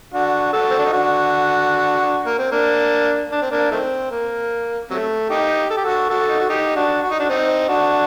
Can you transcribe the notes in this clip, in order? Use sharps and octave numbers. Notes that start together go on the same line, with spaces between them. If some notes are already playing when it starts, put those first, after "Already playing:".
D4 F#4
F#4 A4
C4
D4
D#4
D4 F#4
A#3
C4
A#3 D4
D4
C4
A#3 D4
D#3 A3 C4
A#3
C3 F#3 A3
D#4 G4
A4
G4
F#4 A4
F#4 A4
D#4
F#4
D#4 G4
D4 F#4
F#4
D#4
D4 F#4
C4 D#4
D4 F#4